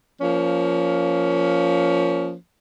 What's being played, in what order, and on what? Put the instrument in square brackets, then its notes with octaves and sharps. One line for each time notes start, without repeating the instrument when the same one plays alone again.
[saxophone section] F3 A#3 C#4